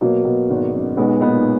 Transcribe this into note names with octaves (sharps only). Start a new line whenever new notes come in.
B2 F#3 A#3
B2
G#1
F#2
B1 G#3 B3
A#2 B3 D#4